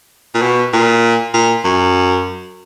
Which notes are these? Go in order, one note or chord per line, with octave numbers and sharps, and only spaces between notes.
A#2
B2
A#2
A#2
F#2